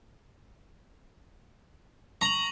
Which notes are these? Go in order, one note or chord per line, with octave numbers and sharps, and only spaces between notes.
A#5 C#6 F7 F#7